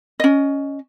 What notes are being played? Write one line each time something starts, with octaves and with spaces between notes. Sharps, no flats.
C#4 D#5